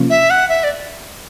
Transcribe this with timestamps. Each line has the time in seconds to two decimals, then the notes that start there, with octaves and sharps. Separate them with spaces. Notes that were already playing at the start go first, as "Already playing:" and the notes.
Already playing: C3 F3 A#3 C#4 F4
0.10 E5
0.30 F#5
0.49 E5
0.64 D5